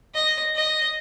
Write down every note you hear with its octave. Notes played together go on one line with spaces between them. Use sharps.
D#5
D#5